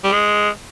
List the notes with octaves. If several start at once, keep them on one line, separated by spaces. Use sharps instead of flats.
G3
G#3